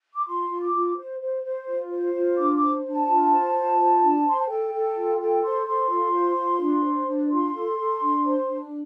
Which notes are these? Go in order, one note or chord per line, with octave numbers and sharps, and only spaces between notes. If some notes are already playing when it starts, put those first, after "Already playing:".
D6
F4 C6
F4
D6
F4
C5
C5
C5
F4
C5
F4
D4 D6
D6
C5
D4
A5
F4
C5
F4
C5
D4
C5 C6
A5
A4 G5
A4
F4
A4 G5
C5 C6
A4 C6
F4
C5
F4
D4
C5
D4
F4 C6
A4
A4
D4
C5
D4